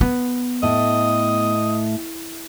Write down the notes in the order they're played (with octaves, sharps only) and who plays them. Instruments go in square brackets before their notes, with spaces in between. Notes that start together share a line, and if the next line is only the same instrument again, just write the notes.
[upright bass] B3
[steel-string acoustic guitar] A2 [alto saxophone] D#5